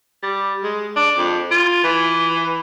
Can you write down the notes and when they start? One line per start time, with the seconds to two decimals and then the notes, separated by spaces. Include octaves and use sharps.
0.23 G3
0.64 G#3
0.96 D4
1.18 F2
1.51 F4
1.84 E3